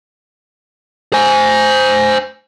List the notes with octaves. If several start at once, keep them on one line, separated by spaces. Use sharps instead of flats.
C5 G#5